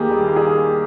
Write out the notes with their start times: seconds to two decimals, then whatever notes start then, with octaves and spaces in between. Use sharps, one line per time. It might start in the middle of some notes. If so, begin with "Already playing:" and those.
Already playing: D#2 D#3 A#3 G4 G#4
0.10 G3
0.28 A#3
0.36 G#4